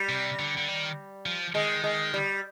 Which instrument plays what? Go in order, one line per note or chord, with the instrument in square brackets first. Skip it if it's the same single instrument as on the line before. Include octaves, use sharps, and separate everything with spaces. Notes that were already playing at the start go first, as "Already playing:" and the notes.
Already playing: [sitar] G3
[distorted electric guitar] C3
D3
D3
D#3
F3
[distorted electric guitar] D#3 [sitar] G#3
[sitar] G#3
G3